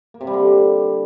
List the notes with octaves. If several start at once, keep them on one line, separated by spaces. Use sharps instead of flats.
A#3
C3
G3
D3